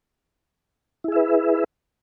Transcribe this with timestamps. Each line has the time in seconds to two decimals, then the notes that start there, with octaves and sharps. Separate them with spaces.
1.04 E4
1.08 G#4
1.12 E5
1.16 B4